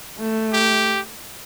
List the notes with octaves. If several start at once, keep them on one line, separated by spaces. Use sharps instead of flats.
A3
G4